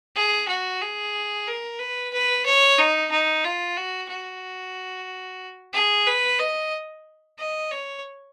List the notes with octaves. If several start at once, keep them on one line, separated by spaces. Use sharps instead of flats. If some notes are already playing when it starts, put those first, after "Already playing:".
G#4
F#4
G#4
A#4
B4
B4
C#5
D#4
D#4
F4
F#4
F#4
G#4
B4
D#5
D#5
C#5